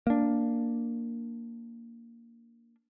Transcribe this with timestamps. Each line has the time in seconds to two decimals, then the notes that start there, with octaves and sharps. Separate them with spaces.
0.07 A#3 D4